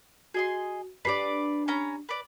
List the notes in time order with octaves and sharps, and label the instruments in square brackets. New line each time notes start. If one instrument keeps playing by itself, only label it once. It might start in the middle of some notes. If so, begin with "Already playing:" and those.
[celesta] F#4 [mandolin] G#4 D#5 C6
[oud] D4 G4 [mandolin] B4 D5 [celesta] B6 C7
[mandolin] C#4 A#5 B5
B4 D5